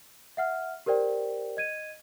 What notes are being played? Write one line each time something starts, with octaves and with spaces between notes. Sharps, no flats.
E5 F#5 F6
G4 A#4 C5 D5 G5
D#5 G#6 D#7